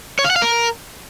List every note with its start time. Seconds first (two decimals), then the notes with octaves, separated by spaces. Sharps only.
0.19 C#5
0.25 F5
0.30 F#5
0.36 F5
0.42 A#4